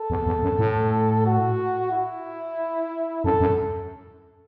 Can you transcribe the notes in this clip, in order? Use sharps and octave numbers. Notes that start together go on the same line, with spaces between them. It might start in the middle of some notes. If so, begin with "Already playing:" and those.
Already playing: A4
E2
E2
F#2
A2
F#4
E4
F#2 A4
F#2